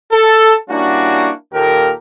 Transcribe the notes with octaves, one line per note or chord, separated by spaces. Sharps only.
A4
G3 A#3 C#4 D4 E4 F#4
D#2 A#2 G4 A4 A#4